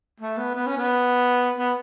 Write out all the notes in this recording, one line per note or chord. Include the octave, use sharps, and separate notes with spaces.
A3
B3
B3
C#4
B3
B3